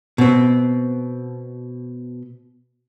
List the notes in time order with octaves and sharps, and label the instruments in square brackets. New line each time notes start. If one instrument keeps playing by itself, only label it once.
[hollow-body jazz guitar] B2 C4